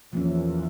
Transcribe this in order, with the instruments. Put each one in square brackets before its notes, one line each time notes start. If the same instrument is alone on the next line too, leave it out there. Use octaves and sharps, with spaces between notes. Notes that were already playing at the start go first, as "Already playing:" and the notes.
[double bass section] E2 E3 [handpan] F3 A#3 C#4